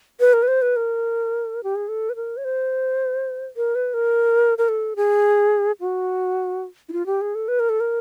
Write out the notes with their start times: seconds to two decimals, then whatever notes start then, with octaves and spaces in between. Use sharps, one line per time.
0.20 B4
0.33 A#4
0.43 B4
0.48 C5
0.62 B4
0.76 A#4
1.63 G4
1.76 G#4
1.88 A4
2.10 B4
2.16 A#4
2.37 C#5
2.45 C5
3.57 A#4
3.75 B4
3.94 A#4
4.58 A#4
4.69 A4
4.96 G#4
5.81 F#4
6.89 E4
6.93 F4
7.06 G4
7.21 G#4
7.35 A4
7.48 B4
7.60 A#4
7.69 A4
7.80 A#4